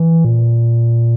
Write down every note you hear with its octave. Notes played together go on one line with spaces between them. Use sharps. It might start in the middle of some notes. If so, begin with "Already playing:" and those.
Already playing: E3
A#2